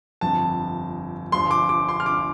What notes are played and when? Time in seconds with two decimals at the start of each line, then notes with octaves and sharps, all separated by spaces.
0.21 G1 F2 F3 A5
1.32 G1 G2 F3 C6
1.51 D6
1.69 D6
1.89 C6
2.00 F6
2.06 D6